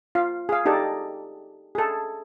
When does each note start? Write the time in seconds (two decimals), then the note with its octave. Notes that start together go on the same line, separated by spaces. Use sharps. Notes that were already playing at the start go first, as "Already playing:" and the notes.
0.15 F4 F5
0.49 G#4 F5
0.66 D#4 G4 A4 D5
1.75 G#4 A4